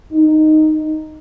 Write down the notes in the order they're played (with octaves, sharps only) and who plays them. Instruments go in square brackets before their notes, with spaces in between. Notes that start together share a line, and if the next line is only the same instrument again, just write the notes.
[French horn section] D#4